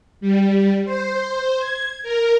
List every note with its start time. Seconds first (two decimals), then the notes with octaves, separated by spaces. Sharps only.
0.21 G3
0.85 C5
1.57 G#6
2.03 A#4